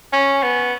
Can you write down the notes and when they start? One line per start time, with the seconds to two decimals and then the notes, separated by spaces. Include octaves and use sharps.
0.13 C#4
0.43 B3